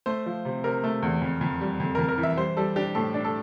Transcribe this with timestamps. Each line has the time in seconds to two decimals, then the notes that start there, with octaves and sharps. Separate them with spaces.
0.06 A3 C5
0.26 F3
0.45 C3
0.64 C3 A#4
0.84 A3
1.02 E2
1.22 F2
1.41 F2
1.61 G3
1.80 F2
1.95 F2 A#4
2.09 A#4
2.18 E3
2.23 E5
2.37 G3 C5
2.57 G3 A4
2.76 D4 G4
2.95 A2 A4
3.14 D4
3.25 A4